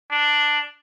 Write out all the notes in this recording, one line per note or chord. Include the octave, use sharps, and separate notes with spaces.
D4